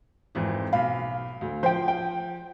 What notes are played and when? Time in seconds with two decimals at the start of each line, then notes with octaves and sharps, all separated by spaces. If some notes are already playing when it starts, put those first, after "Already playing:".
0.35 G#1 F2 E3
0.73 B1 F5 B5
1.41 D2
1.63 F3 C5 G5
1.88 G5